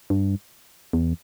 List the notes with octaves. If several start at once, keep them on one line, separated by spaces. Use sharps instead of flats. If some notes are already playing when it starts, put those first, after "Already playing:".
G2
E2